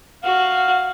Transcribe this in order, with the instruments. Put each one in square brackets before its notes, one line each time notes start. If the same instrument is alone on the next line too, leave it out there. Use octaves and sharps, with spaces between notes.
[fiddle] F#4 [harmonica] F5